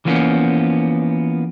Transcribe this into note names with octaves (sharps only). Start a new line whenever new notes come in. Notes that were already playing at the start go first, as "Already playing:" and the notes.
E3 F3 A#3 B3 C#4